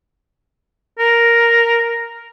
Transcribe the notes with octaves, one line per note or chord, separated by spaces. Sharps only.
A#4